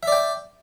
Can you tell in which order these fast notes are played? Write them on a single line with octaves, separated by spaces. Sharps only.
E5 D5 G5